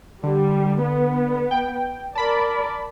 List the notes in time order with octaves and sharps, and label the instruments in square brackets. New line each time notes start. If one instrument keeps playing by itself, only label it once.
[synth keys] D3 [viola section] G3
[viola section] B3
[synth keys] G5
[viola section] A#4 D5 [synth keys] A5 B5